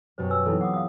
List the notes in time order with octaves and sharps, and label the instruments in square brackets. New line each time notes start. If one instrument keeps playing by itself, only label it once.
[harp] F#2 B2 G3 [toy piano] C5
[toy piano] B4 G#5 E6
[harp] E3 C4 [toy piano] D#4 E4 A4
[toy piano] F#5 D6 D#6
F5 D#6